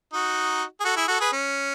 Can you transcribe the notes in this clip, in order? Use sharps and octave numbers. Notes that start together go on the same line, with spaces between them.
D#4 F#4
G#4
F#4 A4
E4 G#4
F#4 A4
G#4 B4
C#4